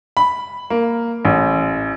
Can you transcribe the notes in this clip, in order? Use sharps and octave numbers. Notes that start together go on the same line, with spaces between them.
B5
A#3
A1